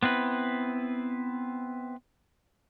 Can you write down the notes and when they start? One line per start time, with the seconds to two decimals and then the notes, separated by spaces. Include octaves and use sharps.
0.03 B3 C4 E4 B4